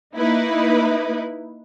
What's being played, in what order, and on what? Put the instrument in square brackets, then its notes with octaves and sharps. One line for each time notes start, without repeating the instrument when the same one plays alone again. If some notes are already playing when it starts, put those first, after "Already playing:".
[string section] A#3 D#4 E4 B4